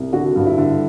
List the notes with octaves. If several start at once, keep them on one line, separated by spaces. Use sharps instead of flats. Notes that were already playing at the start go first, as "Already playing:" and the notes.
Already playing: C2
D3 F#4
G2
E4
D3